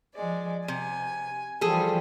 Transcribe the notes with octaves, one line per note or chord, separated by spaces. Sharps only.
F3 G#3 D5
C3 G#5
E3 F3 G3 G#4 A4